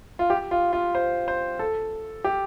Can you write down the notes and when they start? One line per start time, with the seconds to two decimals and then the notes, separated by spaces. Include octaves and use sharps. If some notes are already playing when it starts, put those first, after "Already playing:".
0.19 F4
0.30 G4
0.51 F4
0.73 F4
0.95 C5
1.28 C5
1.59 A4
2.24 G4